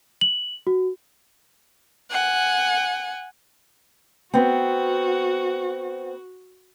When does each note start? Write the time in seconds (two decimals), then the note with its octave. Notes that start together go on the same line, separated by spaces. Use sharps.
0.21 F#7
0.67 F#4
2.11 F#5 G#5
4.34 B3 C4 F#4